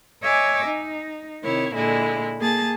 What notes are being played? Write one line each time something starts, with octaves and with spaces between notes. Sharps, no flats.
C#5 D#5 E5 G#5 D6
D#4
C3 D#3 E4 C#5
A#2 D3 G#3 E4
A#3 G#4 A5 A6